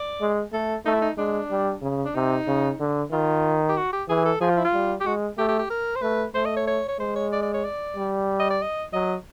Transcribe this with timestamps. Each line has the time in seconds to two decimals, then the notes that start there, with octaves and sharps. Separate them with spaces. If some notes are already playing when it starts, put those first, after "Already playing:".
Already playing: D5
0.21 G#3
0.53 A3 A4
0.85 A3 D#4
0.94 E4
1.02 D#4
1.17 G#3 D4
1.51 G3
1.82 C#3
2.05 D4
2.15 C3 D#4
2.47 C#3
2.80 D3
3.12 D#3 F4
3.69 G4
3.77 F#4
3.93 G4
4.09 E3 G#4
4.25 A4
4.41 F3 G#4
4.50 F4
4.57 E4
4.65 F4
4.73 G3
5.01 G4
5.06 G#3 F#4
5.38 A3 G4
5.49 G4
5.59 G4
5.70 A#4
5.96 C5
6.02 A3 B4
6.35 A3 C5
6.45 D#5
6.57 C#5
6.67 C#5
6.88 C#5
6.99 G#3 C5
7.16 C#5
7.32 D5
7.42 D5
7.54 C#5
7.65 D5
7.96 G3
8.40 D#5
8.50 D5
8.62 D#5
8.93 F#3 D#5